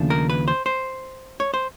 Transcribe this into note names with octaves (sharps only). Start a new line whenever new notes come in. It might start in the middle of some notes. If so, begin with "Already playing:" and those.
Already playing: D#2 C#3 F3 A3 D4
A#4
B4
C5
C5
C#5
C5